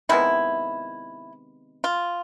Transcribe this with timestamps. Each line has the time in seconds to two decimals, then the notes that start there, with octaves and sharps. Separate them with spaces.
0.09 C3 D#3 G#3 B3 E4
1.84 F4